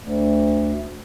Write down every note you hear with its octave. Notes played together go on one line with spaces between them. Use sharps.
D2